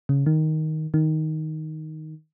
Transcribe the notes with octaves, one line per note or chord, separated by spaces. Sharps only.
C#3
D#3
D#3